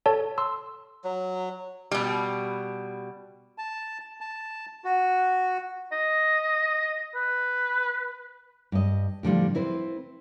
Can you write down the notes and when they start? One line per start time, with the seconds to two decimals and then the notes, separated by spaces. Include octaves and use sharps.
0.06 A4 C#5 A5
0.38 C6 E6
1.04 F#3
1.91 B2 G3
3.58 A5
4.21 A5
4.85 F#4
5.92 D#5
7.15 B4
8.72 G2 D#5
9.23 A2 D3 F3 G3
9.55 C4 E4 B4 C5